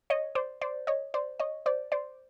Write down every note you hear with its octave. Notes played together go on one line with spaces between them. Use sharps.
C#5 D#5
C5 D5
C5 D5
C#5 D#5
C5 D5
C#5 D#5
C5 D5
C5 D5